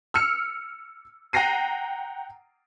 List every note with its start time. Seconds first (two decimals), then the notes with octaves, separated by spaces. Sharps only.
0.14 E6 F6 C#7
1.33 F#5 G5 A#5 A#6 C7 D#7